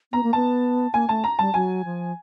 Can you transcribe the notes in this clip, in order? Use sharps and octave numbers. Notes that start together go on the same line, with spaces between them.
B3 A#5
A#3
B3 A5
A#3 G#5
A3 A5
A#5
G3 A5
F#3 G#5
F3